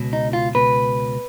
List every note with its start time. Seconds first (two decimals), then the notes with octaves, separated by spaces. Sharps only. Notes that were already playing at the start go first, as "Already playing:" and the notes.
Already playing: C#2 B2
0.13 D#4
0.33 F4
0.54 C#2 B2 B4